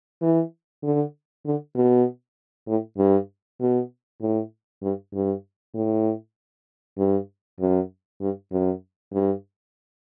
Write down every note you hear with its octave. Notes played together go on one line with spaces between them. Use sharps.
E3
D3
D3
B2
A2
G2
B2
A2
G2
G2
A2
G2
F#2
G2
F#2
G2